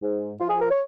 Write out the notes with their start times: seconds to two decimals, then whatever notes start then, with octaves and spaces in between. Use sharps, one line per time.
0.02 G#2
0.40 F3 F4
0.50 G#4
0.60 A#4
0.70 C#5